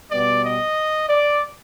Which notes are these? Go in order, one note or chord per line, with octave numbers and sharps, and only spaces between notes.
B2 G3 B3 D5
D#5
D5